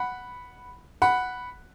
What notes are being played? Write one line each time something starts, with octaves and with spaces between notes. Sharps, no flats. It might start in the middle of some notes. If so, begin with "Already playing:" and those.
Already playing: F#5 B5
F#5 B5